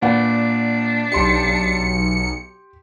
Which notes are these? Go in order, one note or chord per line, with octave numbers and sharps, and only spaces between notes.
A#2 D4 B4 F#5
B1 G4 G5 C6 C#7